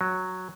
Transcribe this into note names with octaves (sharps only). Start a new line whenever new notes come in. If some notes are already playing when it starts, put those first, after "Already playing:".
F#3